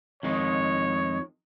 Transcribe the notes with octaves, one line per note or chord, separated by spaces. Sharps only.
F2 D#3 G#3 D#4 C#5